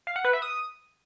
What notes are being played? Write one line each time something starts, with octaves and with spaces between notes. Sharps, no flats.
F5
F#5
B4
E5
D#6